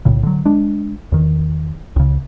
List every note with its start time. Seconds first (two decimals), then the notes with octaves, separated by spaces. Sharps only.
0.05 B1 A2 C#3
0.23 D3 F#3
0.45 G#3 D4
1.12 E2 D#3
1.96 C#2 C#3